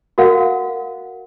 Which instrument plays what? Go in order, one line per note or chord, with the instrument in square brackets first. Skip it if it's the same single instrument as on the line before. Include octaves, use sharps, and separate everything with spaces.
[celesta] F#4 A#4 F5 F#5